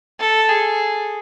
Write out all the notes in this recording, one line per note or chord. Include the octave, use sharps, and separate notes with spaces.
A4
G#4